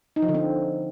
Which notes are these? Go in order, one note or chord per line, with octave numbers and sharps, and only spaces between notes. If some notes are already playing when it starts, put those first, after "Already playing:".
D#4
F3
D3
C4